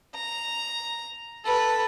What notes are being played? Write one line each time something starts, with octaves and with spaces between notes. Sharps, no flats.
A#5
A4 B4